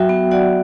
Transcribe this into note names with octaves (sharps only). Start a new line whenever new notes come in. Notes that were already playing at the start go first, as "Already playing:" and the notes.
Already playing: F#3 F#4 E5 G5
B3
F#4 D5 F#5